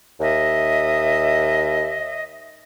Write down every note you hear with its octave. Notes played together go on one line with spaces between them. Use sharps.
D#2 D#5 E5